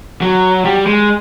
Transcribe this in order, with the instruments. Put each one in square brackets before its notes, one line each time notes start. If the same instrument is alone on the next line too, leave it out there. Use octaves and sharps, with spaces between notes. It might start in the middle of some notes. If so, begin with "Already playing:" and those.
[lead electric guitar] F#3
G3
G#3